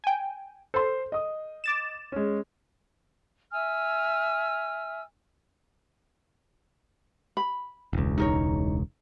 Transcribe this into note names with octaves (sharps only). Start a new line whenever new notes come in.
G5 G#5
A4 C5 C6
D#5 D#6
D6 A6 E7
G#3 C#4
E5 G#5 E6 F6
B5
E1 C#2
D#4 A#4 C#5